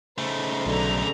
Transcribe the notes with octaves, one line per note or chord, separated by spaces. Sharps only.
C#3 A3 D#4 C5
B1 D3 D4 A#5